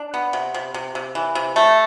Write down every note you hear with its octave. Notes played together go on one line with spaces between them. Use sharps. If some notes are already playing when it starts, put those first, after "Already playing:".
Already playing: D4
B3
C3
C3
C3
C3
E3
C3
A3